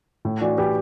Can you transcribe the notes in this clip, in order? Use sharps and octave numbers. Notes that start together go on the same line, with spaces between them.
A2
E3 D4 F#4
E3 G4 B4